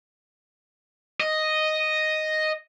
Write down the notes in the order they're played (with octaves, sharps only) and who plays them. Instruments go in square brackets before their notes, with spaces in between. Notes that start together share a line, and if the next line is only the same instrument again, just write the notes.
[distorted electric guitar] D#5